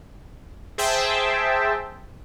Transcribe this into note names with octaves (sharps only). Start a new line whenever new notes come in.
G#4 C5 E5 G5 A5